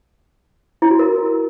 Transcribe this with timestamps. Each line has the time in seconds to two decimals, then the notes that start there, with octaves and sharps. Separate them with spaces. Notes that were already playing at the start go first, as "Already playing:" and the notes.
0.82 E4
0.91 F#4
0.99 A#4